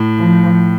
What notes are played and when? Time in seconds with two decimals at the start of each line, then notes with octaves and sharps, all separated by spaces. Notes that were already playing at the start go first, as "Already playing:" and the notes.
Already playing: A2
0.18 F3